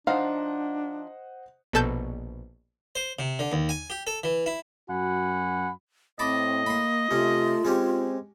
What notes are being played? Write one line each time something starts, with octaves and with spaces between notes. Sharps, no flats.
F3 D4 D#4 C5 D#5 F5 F#5
A#1 B2 A4 A5 G6
C5
C3
D3
D#2
G#5
G4
A4
E3
E4
F#2 F#4 F#5 G#5 B5
A2 C4 D#5 A5 B5 D6
A#3 B5 C6
C3 A3 C#4 F4
G#3 C4 C#4 G4